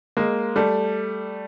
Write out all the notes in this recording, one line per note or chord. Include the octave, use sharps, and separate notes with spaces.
G#3 A#3
G3 A3